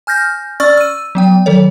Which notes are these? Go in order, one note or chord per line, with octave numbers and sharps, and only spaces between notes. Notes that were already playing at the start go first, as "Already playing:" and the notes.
G#5 F6 G6 A#6
C#4 D5 C#6 E6 F6 A6
E6 D#7
F#3 B3 G5
D#3 F#3 A4 C#5